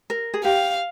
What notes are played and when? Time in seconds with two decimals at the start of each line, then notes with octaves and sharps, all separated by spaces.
0.10 A#4
0.34 G#4
0.44 G4 F5